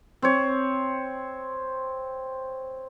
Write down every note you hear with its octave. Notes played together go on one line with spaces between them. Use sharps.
C4 C#5